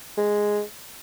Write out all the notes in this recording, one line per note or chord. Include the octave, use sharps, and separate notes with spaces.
G#3